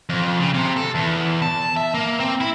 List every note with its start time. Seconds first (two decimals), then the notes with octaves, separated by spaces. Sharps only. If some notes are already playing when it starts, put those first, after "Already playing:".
0.09 F2
0.40 C#3
0.54 C3
0.76 A4
0.95 E2
1.42 A5
1.77 E5
1.94 A#3
2.20 C4
2.41 E4